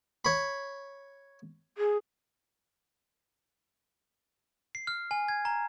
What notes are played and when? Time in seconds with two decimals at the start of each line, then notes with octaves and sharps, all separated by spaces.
0.25 C#5 B5
1.78 G#4
4.75 C7
4.87 F6
5.11 G#5
5.28 G#6
5.45 A#5